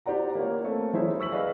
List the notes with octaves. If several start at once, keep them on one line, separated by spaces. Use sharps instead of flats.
E4 G4 C5 D5 F#5 A#5
A#3 C#4 F4 C#5
A3 A#3 C4 C#4
F#3 E4 G#4 C5 C#5 E5
C#6 E6 B6 F#7
G#4 B4 D5 D#5 F5